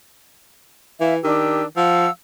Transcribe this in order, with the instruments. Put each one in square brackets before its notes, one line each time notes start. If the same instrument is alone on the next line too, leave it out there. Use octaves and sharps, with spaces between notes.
[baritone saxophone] E3 [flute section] E5 F5
[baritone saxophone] D#3 [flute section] D4 G4 E6
[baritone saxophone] F3 [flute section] F5 F#5 E6